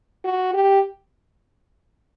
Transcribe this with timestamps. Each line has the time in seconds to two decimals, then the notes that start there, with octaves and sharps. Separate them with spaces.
0.25 F#4
0.54 G4